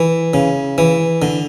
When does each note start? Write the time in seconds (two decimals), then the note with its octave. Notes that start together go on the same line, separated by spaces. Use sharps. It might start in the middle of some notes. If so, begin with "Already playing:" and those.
Already playing: E3
0.34 C#3
0.78 E3
1.22 D3